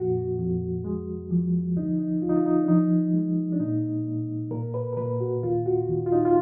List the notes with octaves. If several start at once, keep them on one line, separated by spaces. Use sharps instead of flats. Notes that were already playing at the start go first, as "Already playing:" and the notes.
Already playing: F2 A#2 F#4
F2
G#3
F3
D2 D#4
D#4
D2 F4
D#4
F4
D#4
D4
F3 D#4
G#3
D4
A#2 D#4
A#2
A#2 A#4
B4
A#4
A#2 B4
F#4
D#2 F4
F#4
D#2
F4
D#4
F4